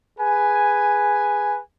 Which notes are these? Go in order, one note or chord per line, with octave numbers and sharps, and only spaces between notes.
G#4 B4 G#5